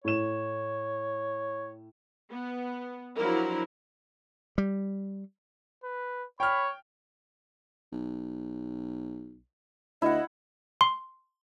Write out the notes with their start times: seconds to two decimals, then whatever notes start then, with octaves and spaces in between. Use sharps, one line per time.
0.04 A2 C#5 E7
2.31 B3
3.17 F3 F#3 D4 E4 A#4
4.58 G3
5.84 B4
6.40 C#5 G5 B5 F6
7.92 B1
10.02 D2 E4 D#5 F#5
10.81 C6